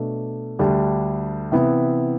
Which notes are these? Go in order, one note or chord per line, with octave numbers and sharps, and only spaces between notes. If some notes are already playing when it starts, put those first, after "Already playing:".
Already playing: B2 A3 D4
D2 D3 G3 D4 G4
C3 E3 B3 E4